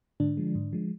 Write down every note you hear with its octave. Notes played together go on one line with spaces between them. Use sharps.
G#2 D3 D4
F3 G#3
G#2
F3 G#3